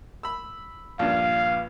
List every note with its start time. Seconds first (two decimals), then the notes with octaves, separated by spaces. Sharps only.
0.23 B5 E6
0.99 A#1 G2 F5